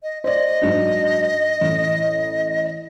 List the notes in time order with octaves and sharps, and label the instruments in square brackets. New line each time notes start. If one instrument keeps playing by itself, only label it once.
[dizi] D#5
[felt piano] C5 D5 [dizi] D#5
[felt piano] G#2 F#3 D4
A1